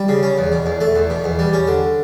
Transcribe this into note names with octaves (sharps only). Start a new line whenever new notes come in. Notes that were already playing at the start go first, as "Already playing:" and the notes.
Already playing: G3
C#3
C#4
E2
B2
E2
A3
E2
B2
E2
G3
C#4
D3